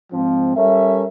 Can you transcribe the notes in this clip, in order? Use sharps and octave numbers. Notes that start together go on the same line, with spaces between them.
G#2 F3 C4
G3 C#4 A4 A#4 E5